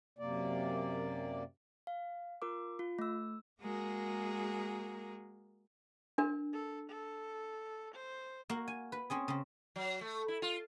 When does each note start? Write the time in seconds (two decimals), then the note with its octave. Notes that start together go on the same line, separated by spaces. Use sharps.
0.19 F#2 C3 A#3 D5
1.87 F5
2.42 F4 A#4 D6
2.79 F4
2.99 A3 E6
3.60 G#3 A#3 F#4 G#4 A#4
6.18 D4 A#4
6.53 A4
6.90 A4
7.95 C5
8.50 A#3 F#4 A#4
8.68 G#5
8.92 B4
9.10 C4 C#4 G#4
9.28 C#3 C4
9.76 F#3
10.01 A3
10.28 E4
10.42 F4